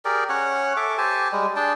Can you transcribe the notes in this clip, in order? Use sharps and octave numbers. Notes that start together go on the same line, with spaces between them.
G4 G#4 A#4 D5
C#4 C#5 F#5
A4 E5 D6
G4 C5 G#5 A5
G3 G#3
D4 G#4 G5 A5